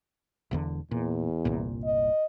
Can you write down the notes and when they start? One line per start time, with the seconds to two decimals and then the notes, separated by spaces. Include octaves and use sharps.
0.51 E1 E2 D3
0.91 E2 A#2
1.45 G1 C2 A#2
1.85 D#5